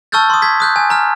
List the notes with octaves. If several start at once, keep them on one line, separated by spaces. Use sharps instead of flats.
A5 C#6 E6 F6 G6 A6
C6 D#6
G#6 B6
D#6 F#6 G6
G#5
A#5 F6